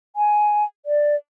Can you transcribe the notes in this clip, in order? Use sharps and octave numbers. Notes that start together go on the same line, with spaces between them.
G#5
D5